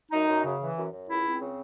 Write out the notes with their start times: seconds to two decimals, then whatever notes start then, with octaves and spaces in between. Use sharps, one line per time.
0.12 F#2 D#4
0.28 F#2
0.44 C#3
0.60 E3
0.76 F#2
0.92 F#2
1.09 C#2 E4
1.24 C4
1.40 C#3